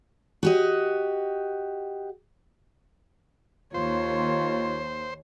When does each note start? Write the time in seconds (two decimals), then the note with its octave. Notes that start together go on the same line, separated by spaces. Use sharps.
0.43 F#4 G4 D#5
3.74 D#2 F4 C5 C#5